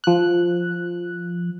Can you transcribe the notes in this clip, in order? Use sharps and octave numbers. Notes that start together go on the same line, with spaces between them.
F3 F#6